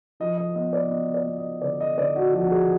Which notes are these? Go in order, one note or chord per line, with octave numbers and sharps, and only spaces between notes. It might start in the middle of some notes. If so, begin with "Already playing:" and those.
F3 D#5
D#5
B3 D#5
D5
B3 D#5
D5
B3
D#5
D3 D5
D#5
D3 D5
F#4
F3 F#4
F#4
G#4